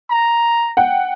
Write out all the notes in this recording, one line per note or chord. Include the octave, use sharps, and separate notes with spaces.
A#5
F#5 G5